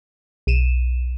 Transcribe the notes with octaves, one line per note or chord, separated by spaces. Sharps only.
B1 D#7 E7